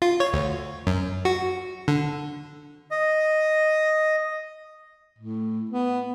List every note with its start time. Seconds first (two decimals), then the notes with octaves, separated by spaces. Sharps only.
0.02 F4
0.20 C#5
0.33 D2
0.87 F#2
1.25 F#4
1.88 D3
2.91 D#5
5.18 A2
5.71 B3